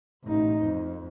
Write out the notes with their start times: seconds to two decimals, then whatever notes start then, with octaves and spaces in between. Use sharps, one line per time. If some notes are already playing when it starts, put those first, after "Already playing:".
0.24 A1 D#4
0.63 F2